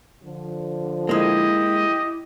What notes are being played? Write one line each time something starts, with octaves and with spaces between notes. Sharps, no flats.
D3 F3
G#3 A#3 E4 G4 D#5